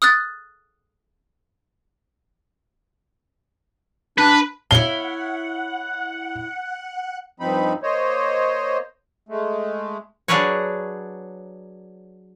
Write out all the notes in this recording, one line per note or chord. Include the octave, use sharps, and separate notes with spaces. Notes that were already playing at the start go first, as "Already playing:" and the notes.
D#6 F6 F#6 A6
D4 B4
E4 C#5 F5 F#5 G7
G2 F3 C4 D#4 B5
A#3 C5 C#5 D#5
G#3 A3
F#3 D4 G#4 A#4 B4 C#5